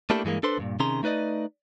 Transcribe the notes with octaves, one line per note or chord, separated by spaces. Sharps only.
A3 A#3 D4 E4 G4 A4
G2 E3 G#3 A#3
D4 A4 B4 C5 C6
D2 G2 A#2
C3 D#3 C#4 G#4 A#5 C6
A3 D#4 B4 D5 D#5